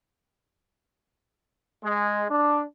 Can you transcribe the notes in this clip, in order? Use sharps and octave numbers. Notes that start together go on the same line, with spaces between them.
G#3
D4